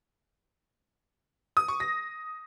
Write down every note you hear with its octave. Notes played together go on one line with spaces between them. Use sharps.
D#6
C#6
A#6